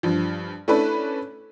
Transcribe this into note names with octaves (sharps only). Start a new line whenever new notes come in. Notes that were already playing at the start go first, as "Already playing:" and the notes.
G2 F3
A3 C#4 D4 E4 A4 B4